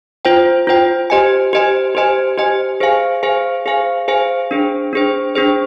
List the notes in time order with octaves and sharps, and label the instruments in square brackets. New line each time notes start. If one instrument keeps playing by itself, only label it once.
[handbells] F4 C5 G5
F4 C5 G5
G4 C5 D#5 G#5
G4 C5 D#5 G#5
G4 C5 D#5 G#5
G4 C5 D#5 G#5
G#4 C5 F5 G#5
G#4 C5 F5 G#5
G#4 C5 F5 G#5
G#4 C5 F5 G#5
D4 G#4 C5
D4 G#4 C5
D4 G#4 C5